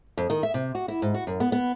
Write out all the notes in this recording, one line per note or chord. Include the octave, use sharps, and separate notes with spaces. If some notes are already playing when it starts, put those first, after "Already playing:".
F2
D#3
E5
C3
F#4
E4
G#2
F#4
F#2
B3
B3